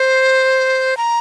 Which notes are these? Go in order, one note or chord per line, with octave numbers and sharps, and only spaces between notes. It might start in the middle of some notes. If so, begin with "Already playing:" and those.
Already playing: C5
A#5